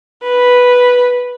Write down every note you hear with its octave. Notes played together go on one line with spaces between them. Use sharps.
B4